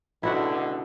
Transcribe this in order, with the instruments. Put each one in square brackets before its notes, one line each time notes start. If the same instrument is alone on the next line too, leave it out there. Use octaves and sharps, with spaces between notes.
[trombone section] C#2 B2 D3 [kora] E4 F#4 F#5